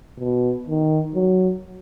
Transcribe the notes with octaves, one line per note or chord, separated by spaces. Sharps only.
B2
D#3
F#3